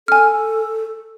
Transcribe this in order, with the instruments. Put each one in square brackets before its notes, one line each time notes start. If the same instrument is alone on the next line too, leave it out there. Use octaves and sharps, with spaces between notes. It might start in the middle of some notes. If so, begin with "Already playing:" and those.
[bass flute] A4 [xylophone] G#5 F6